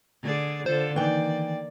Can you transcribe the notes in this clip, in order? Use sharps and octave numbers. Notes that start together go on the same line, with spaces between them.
D3 G#4 D5
D3 F4 A4 C5
D#3 E3 A#3 D5 G5